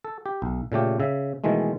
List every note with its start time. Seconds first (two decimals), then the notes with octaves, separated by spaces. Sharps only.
0.04 A4
0.26 G4
0.42 B1
0.72 A#2 C#3 A3 G4
1.00 C#3 E5
1.44 B2 D#3 E3 G#3 A3